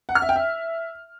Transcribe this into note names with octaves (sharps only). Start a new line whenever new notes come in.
F#5
F6
E5
G5
E5